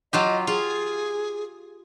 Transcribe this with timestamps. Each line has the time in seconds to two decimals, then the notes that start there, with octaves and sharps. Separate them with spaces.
0.13 F#3 F4 G4 D#5
0.47 F4 G#4